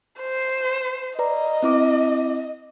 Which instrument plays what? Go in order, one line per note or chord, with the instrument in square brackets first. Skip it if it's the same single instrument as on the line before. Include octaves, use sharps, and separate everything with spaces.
[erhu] C5
[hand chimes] B4 D5 A#5 [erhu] D#5
[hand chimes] C4 E4 D6